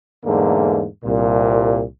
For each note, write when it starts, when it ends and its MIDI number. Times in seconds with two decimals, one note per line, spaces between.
0.25 0.85 40
0.25 0.85 44
0.25 0.85 50
0.25 0.85 57
0.25 0.85 58
1.03 1.82 36
1.03 1.82 46